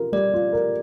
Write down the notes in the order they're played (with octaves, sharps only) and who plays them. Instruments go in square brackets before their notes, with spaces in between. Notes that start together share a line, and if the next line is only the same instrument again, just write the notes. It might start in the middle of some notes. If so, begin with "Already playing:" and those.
Already playing: [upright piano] F4 A#4
[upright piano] G3 [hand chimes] D5
[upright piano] F4
A#4